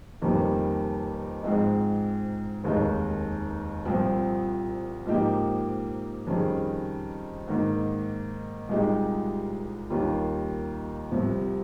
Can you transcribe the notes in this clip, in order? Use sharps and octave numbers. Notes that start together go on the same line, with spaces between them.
F1 F2 D#3 G3 A#3
G#2 F3 G#3 C4 D#4
F1 D#2 D#3 G#3 D#4
C2 A#2 F3 C4
G#2 F3 A#3 D#4 G4
F2 D#3 G3 C#4 G#4
G#2 D#3 A#3
C2 A#2 G#3 D#4 G4
D#2 D#3 G3 A#3 F4
C2 C3 F3